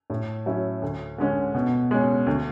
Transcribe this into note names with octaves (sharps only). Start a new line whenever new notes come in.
A2
F#3 C#4 E4
D2
D3 G#3 C#4
B2
G#3 C#4
D2